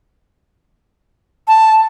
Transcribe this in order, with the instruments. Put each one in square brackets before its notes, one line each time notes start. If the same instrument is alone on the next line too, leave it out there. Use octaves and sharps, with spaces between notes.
[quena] A5